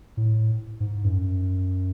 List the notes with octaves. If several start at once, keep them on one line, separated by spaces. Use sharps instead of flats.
A2
G#2
F#2